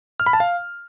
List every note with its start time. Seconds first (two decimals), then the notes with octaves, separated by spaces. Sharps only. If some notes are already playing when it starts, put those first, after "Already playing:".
0.20 F6
0.26 B5
0.33 A5
0.40 F5